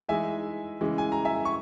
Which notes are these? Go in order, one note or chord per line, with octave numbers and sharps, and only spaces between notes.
E3 G#3 D#4 E5 G#5
C#3 E3 G#3
G#5
A#5
E5 G#5
C#6